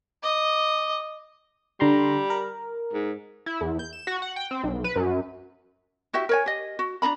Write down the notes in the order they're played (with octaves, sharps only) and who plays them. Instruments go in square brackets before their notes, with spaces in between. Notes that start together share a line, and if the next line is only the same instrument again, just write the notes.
[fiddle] D#5 [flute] D6
[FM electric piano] D3 A#5 C6 [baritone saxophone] G3
[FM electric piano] A#4
[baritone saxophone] G#2
[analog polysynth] E4
E2
G6
E7
F#4
F#5
G5
C4
B1
B4
F#2
[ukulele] E4 F#4 G4 E5
A#4 C#5 G#5
G4 D#5
F#4
D4 D#4 A#5 B5